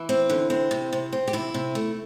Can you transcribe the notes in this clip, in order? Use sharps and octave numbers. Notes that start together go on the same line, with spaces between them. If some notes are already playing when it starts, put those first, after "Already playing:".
Already playing: E3 E4
C4
D3
C4
C3
C3
C4
G4
C3 E4
C3
A3